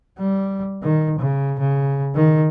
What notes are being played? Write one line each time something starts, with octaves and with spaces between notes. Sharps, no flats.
G3
D#3
C#3
C#3
D#3